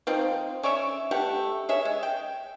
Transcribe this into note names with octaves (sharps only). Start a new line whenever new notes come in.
F3 C4 D#4
C#4 C#5 D5 E5
G3 A3 G4 F#5
G#4 C#5 E5
G#3
G5